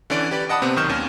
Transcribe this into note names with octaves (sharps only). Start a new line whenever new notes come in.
D3 E3 C#4 D5 D7
G4 B4 D5
D#5 F#5 A5 B5 D#6
C3 B3 C4
B1 D#3 C#6 F6 G6 E7
D#2 C#4